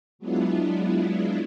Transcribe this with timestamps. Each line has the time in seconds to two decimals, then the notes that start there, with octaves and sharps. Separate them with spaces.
0.19 F#3 G#3 B3 D4 E4 F4